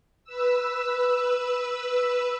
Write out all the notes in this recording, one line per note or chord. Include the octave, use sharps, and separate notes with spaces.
B4 E6